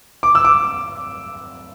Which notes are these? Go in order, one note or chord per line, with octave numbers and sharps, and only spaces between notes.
D6
E6
D6